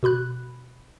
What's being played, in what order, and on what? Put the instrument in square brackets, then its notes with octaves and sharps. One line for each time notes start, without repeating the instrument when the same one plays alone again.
[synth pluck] B2 F#4 B5 F#6